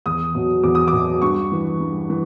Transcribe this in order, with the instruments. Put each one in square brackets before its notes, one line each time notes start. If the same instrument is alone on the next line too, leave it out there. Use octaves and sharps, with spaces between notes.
[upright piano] E2 D#6
B2 F#3
E2 D6
D#6
D6
B2 F#3
G2 C#6
E3
G2
E3